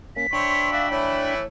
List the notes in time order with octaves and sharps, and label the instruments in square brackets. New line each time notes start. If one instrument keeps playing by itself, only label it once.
[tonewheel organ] A#3 C#4 [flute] B6
[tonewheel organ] D4 G5 B5 [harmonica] C5 C#5 E5
[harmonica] F#4 D5 E5 [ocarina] F5
[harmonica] E3 A3 E4 [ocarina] C#5